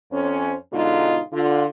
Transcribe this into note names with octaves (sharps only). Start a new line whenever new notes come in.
F2 C#4 C5
G#2 B2 D3 G#3 D#4 F4
D3 F4